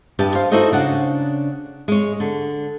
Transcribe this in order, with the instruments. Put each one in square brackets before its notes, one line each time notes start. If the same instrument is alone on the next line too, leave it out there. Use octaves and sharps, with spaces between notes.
[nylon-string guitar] G2 D4 G4 B4 D#5 A5
C5 F5
D#4 E4 F#4 A4 C5 D#5
C#3 D4 F#5
G#3 C#5
D3